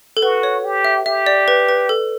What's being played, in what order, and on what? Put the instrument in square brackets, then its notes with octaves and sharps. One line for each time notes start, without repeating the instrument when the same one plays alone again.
[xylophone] A4
[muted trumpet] F#4 [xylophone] B4
[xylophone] C#5
[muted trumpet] G4
[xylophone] E5
[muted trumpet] G4 [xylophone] E5
[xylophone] D5
B4
B4
A4